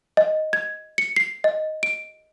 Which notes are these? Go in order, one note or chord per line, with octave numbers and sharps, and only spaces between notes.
D#5
G#6
C#7
C7
D#5
D7